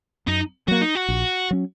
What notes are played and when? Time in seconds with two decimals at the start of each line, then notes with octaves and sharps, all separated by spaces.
0.27 F#2 D#4
0.68 F#3 A#3 F#4
0.82 D#4
0.95 F#4
1.08 A#1
1.51 F#3 C#4